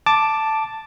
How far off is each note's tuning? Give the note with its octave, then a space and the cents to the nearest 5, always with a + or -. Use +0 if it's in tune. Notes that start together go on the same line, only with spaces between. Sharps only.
A5 +0 D6 +5